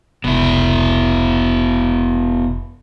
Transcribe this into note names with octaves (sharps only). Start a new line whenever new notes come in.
F1 C#2 B2 E4